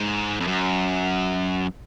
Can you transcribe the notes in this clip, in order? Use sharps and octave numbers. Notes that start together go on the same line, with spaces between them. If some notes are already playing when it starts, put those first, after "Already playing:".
Already playing: G#2
F2
F#2